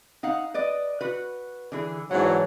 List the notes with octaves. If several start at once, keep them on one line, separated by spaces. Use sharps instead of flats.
D#4 F5 F#5
B4 D5 D#5
F#4 B4
D3 E3 G#4
G#2 E3 F#3 D4 F#5